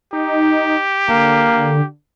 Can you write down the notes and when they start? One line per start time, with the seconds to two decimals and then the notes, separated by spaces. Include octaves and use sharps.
0.13 D#4 G4
1.09 D3 A#3